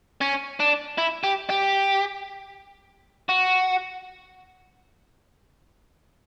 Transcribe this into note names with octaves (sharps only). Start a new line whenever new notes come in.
C#4
D4
E4
G4
G4
F#4